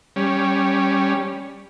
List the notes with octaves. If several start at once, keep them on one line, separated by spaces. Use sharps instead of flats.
G3 C#4